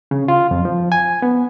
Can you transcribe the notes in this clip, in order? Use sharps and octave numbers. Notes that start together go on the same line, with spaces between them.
C#3
F4
F2
F3
G#5
B3